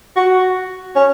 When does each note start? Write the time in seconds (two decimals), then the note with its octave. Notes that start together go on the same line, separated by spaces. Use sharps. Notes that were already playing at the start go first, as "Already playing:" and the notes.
0.16 F#4
0.95 C#4